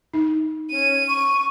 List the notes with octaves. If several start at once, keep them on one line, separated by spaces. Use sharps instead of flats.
D#4
C#4 D#7
C#6